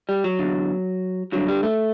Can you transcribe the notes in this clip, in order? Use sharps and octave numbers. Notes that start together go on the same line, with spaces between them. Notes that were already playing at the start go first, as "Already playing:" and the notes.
G3
F#3
E2 D3
G2 D3 F#3
G3
A3